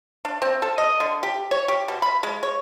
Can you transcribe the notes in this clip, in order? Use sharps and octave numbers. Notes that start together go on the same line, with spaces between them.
D4
C4
A4
D#5
D3
G4
C#5
G4
B2
B5
G#3
C#5